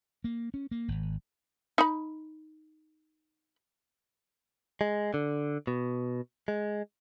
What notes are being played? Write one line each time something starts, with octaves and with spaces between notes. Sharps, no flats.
A#3
C#4
A#3
G#1
D#4 B5
G#3
D3
B2
G#3